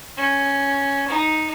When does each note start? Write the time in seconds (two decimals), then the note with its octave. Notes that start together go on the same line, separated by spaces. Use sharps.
0.18 C#4
1.09 D#4